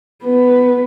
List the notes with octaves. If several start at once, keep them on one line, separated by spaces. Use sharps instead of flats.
B3 B4